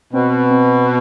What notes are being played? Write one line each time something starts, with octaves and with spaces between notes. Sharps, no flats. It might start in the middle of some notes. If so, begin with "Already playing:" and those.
B2 C4
C4